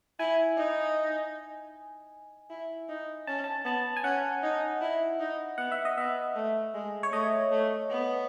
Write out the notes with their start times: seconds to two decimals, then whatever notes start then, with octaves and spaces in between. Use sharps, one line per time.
0.19 E4 G#5
0.57 D#4
2.50 E4
2.89 D#4
3.27 C#4 A5
3.44 A5
3.65 B3 A5
3.96 G#5
4.04 C#4 F#5
4.43 D#4
4.81 E4
5.20 D#4
5.58 B3 F#5
5.72 E5
5.85 D#5
5.97 B3 E5
6.35 A3
6.74 G#3
7.03 C#5
7.12 A3 D#5
7.51 A3
7.90 B3